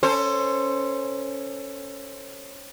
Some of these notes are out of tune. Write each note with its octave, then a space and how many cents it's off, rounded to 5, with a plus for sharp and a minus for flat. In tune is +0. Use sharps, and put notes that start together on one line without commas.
C#4 +0 A4 +25 C5 +0